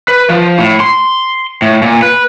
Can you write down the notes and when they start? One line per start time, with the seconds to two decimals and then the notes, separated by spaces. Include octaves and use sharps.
0.08 B4
0.30 F3
0.58 A2
0.80 C6
1.62 A2
1.82 A#2
2.02 B4